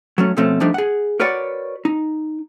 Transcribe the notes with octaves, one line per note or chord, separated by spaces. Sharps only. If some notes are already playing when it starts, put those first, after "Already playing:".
F#3 A3 C#4
B2 F3 A3 C4 C#4
F3 G3 A3 D4 D#4
G#4 F#5
F#4 A#4 B4 C#5 D5 F#5
D#4